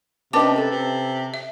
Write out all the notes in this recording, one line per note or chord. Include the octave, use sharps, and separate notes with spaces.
C3 C#4 D4 B4 D#5 A5 D6
A4 B4
C3
E5